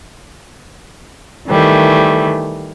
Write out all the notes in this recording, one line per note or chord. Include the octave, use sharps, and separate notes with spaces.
D#3 E3 G3 A3